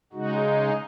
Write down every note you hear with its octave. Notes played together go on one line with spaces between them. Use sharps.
C#3 G#3 D#4 F#4